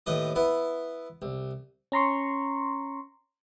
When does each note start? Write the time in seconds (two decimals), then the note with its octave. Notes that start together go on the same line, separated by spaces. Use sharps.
0.06 D#2 A2 B4 D#5
0.35 B3 E4 B4
1.22 C2
1.92 C#4 A#5 C6 C#6